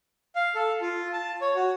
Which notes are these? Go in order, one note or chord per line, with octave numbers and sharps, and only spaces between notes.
F5
A4
F4
A5
C#5
F#4